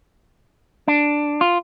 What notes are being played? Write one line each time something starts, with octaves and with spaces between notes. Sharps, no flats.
D4
F4